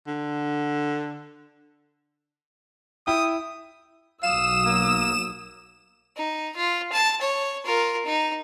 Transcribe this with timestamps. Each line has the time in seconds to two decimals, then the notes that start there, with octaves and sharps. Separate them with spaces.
0.07 D3
3.07 E4 G5 D#6
4.23 B1 F#3 F5 D#6 E6 E7
4.65 A#3
6.16 D#4
6.56 F4
6.92 A5
7.21 C#5
7.65 F4 A#4
8.06 D#4